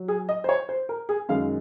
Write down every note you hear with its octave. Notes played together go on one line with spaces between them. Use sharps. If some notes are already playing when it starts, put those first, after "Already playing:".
Already playing: F#3
G#4
D#5
C5
C#5
C5
A#4
G#4
F#2 D#3 G#3 F5